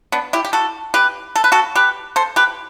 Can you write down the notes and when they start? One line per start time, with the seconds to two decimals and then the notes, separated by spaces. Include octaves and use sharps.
0.12 B3 D4
0.33 E4 G4
0.45 G4
0.53 F#4 A4
0.94 G4 B4
1.35 A4
1.44 B4
1.52 F#4 A4
1.75 G4 B4
2.16 A4 C5
2.36 G4 B4